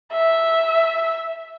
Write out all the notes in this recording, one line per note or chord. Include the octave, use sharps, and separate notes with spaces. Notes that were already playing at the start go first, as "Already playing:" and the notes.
E5